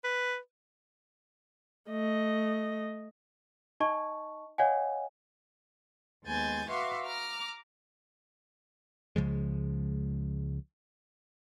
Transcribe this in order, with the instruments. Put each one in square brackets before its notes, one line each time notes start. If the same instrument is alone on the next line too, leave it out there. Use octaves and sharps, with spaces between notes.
[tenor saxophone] B4
[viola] A3 D#5
[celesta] D#4 D#5 A5 C#6
C#5 D#5 F5 F#5 G#5
[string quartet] D#2 G#3 B3 G#5 G6 A6
F#4 B4 E5 F5 C6 D6
A#5 D6 F6
[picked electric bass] C#2 C#3 F3 G#3